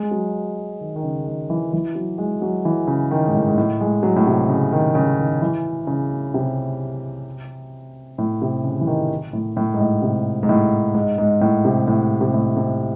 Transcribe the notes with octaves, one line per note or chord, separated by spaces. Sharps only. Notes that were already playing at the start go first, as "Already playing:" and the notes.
Already playing: G#3
F#3
D#3
D#3
C#3
D#3
E3
E3
F#3
G#3
F#3
E3
C#3
D#3
G#2
A2
G#2
A2
G#3
F#3
A2
C3
C#3
D#3
C#3
D#3
E3
C#3
C3
A2
C3
C#3
E3
D#3
A2
A2
G#2
A2
C3
G#2
A2
G#2
G#2
A2
C3
A2
C3
A2
C3